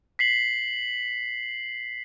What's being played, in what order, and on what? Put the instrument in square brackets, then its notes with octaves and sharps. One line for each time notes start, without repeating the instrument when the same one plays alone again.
[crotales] B6 C7 F#7